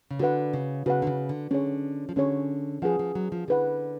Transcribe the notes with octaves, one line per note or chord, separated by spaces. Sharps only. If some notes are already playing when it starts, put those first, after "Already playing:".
C#3
D3 F#4 B4 F#5
C#3
C#3 F#4 B4 F#5
D3
C#3
D3
D3 C#4 G#4 C#5
F3
D3 C#4 G#4 C#5
F3 G#4 B4 F#5
F3
F#3
F3
D3 G#4 B4 F#5